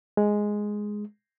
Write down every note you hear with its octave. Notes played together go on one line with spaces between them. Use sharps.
G#3